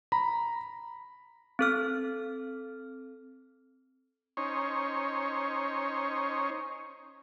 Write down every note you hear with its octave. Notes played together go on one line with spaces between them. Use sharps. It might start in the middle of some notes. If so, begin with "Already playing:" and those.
A#5 B5
C4 A4 F6
C#4 D#4 C5 C#5